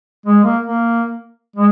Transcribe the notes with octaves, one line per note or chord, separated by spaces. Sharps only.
G#3
A#3
A#3
G#3